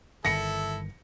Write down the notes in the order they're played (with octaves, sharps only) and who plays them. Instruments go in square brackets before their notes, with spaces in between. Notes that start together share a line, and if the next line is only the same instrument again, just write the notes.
[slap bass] G1 C2 D#3 [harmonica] E4 A4 [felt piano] A#6 C#7